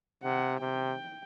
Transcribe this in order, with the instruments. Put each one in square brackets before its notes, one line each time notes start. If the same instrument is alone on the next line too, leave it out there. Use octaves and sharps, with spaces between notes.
[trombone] C3 [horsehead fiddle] F#5
[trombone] C3 [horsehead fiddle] G5